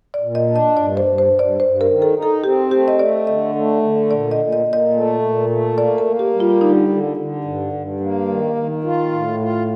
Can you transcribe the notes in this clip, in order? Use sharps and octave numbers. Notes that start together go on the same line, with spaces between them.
D5
A#2
D#5
D4
D#5
G2 D5
C5
G2
C5
G2
D5
G2 C5
A#4
D#3
A4
D#4
A4
C4 G4
A3 G4
D#5
A3 D5
D3 D#5
A3
D3
A#2 D5
D#5
A#2
D#5
A#2
D#5
A3
A#2
A3
A#3 D5
A#4
A#3
G4
G3
F4
D3 D#4
D3
D3
G2
G2
A#3
D#3
D#3
F4
A2
F4